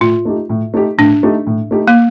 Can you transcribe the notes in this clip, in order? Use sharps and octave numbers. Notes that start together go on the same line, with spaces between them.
A2 F4
A3 D#4 G4
A2
A3 D#4 G4
A2 D4
A3 D#4 G4
A2
A3 D#4 G4
A#3